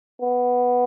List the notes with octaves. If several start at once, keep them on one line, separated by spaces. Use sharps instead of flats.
B3